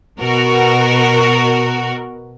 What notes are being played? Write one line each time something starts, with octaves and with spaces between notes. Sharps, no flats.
B2 F#4 A#4